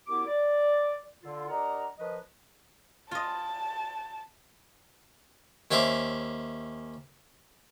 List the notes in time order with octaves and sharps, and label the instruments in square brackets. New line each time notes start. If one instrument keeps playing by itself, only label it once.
[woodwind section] F#2 B3 E4 G4 D6
D5
D3 F4
D4 G4 A#4 D#5 F#5 A#5
D#3 F3 B4 D#5
[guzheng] F4 D#5 [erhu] A5
[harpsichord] D#2 C#4 C5 E5 D6